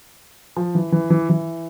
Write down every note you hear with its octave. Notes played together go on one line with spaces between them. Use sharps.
F3
E3
E3
E3
E3